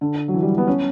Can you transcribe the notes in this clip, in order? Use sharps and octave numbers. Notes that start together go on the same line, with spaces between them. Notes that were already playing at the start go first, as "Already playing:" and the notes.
D3
F#3
E3
G3
B3
C#4